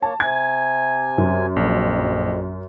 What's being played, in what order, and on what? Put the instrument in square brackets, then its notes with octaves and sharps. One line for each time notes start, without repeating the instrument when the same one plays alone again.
[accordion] A#3 C#5 [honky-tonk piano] A5
[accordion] C3 G#5 [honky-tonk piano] G#6
[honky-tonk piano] F#2
[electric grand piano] A#1 [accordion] F2